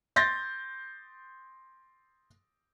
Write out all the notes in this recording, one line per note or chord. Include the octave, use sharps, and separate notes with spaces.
C6 G6 A6 A#6